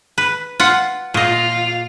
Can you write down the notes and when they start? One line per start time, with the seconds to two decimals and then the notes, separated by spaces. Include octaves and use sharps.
0.18 B4
0.60 F4 F#5
1.14 A#2 F4 D#5 F5